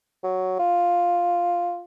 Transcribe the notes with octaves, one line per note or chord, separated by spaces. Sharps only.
F#3
F4